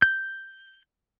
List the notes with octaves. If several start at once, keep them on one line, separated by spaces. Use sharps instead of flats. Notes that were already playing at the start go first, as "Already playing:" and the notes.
G6